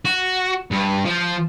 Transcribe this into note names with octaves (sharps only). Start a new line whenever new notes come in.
F#4
G2
F3